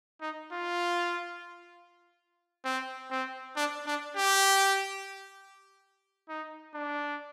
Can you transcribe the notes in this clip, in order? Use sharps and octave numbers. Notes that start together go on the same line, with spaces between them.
D#4
F4
C4
C4
D4
D4
G4
D#4
D4